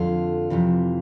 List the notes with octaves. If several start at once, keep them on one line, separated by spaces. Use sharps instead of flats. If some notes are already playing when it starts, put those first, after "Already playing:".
Already playing: F2 D3 F4
F2 C3 E3